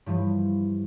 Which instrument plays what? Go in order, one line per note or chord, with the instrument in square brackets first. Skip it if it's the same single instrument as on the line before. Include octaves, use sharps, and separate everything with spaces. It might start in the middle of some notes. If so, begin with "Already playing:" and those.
[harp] G2 E3 F3